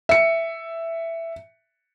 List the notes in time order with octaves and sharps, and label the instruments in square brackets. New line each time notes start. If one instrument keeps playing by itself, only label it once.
[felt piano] E5 C#7